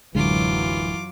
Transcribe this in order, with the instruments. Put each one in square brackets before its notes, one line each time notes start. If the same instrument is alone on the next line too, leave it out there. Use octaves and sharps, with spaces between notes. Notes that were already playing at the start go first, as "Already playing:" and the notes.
[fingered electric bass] D1 D3 G#3 [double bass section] F#2 F#3 [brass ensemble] E3 [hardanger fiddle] F4 D6